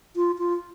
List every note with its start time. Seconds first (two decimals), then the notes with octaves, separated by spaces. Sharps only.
0.16 F4
0.38 F4